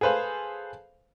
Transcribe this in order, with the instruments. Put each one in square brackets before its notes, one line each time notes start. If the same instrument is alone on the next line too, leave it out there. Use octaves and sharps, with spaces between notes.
[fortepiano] G#4 A4 B4 C5 F5